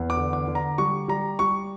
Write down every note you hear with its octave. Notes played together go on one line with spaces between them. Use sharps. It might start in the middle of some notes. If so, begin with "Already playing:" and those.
Already playing: E2
D6
D3
D6
D3
A#5
G3 C#6
G3 A#5
G3 C#6